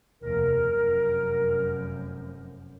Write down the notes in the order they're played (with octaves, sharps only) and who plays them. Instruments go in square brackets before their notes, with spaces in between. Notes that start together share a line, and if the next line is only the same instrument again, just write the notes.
[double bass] F1 D#2 [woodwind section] A#4
[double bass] F1 F#2